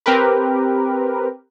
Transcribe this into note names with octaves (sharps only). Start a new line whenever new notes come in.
C4 G4 A#4 B4